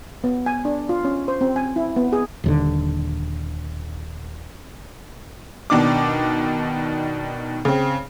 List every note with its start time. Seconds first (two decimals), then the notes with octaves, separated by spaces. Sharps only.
0.24 B3
0.46 G#5
0.65 D4
0.89 F4
1.05 C#4
1.28 C5
1.41 C4
1.56 G#5
1.76 E4
1.96 B3
2.13 G#4
2.44 D#1 D#2 D3
5.70 B2 D#3 D4 D6
7.65 C#3 C4